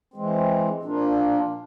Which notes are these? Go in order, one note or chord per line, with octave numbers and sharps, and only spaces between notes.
E3 G#3 C4
A#2 F3 A#3 D4 F4